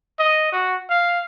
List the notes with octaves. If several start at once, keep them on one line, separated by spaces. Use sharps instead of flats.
D#5
F#4
F5